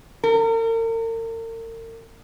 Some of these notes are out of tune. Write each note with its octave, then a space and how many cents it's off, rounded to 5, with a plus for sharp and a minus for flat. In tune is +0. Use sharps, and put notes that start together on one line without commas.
A#4 -40